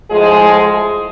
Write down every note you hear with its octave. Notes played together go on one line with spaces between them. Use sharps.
A2 F3 G#3 G#4